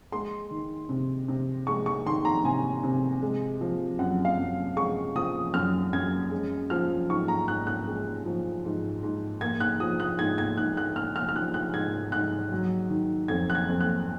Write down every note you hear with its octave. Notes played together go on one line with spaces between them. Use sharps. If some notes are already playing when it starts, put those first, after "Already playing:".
G#3 C6
D#3
C3
C3
G#3 C#6
C#6
D#3 C6
A#5
C3 G#5
C3
G#3
F3
F#2 F#5
F5
F#2
G#3 C#6
F3 D#6
F#2 F6
F#2 G#6
G#3
F3 F6
G#2 C#6
A#5
G#2 F#6
F#6
G#3
F3
G#2
G#2
A#3 G#6
F#6
F3 D#6
F#6
G#2 G#6
G#6
G#2 F#6
F#6
A#3 F6
F6
F6
F3 F#6
F#6
G#2 G#6
G#2 F#6
F#3
D#3
F2 G#6
F#6
G#6
F2
F#6